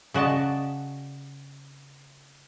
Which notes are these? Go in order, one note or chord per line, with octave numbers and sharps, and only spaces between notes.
C#3 F#4 D5 D#5 A5